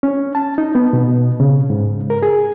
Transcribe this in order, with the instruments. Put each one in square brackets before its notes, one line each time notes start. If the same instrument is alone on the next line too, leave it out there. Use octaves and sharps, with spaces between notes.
[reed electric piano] C#4
A5
D#4
B3
B2
C#3
G#2
A#4
G#4